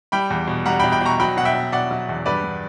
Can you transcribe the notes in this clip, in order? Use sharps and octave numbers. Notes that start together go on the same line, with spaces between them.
G3 G5 B5
E2
B2
G3 F#5 A#5
G5 B5
B2
G5 B5
B2 A#5 C#6
F#3 G5 B5
B2 F#5
E5 G5
B2
B2 D5 F#5
F#3
E2
G2 B4 D5
G2